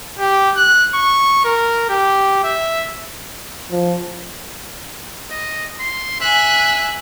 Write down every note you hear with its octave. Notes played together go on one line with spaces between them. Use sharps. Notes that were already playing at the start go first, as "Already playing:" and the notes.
G4
F#6
C#6
A#4
G4
E5
F3
D#5
C6
E5 G#5 F#6